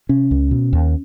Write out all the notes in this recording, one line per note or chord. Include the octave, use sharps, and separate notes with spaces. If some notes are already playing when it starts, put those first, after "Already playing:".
C3 C#4
C#2
B2
D#2